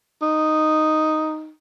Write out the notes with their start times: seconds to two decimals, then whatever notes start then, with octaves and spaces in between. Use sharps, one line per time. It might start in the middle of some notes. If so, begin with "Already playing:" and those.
0.22 D#4